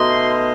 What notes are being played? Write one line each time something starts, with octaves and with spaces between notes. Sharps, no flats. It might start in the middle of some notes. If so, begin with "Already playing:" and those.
Already playing: B2 A3 D#4 C6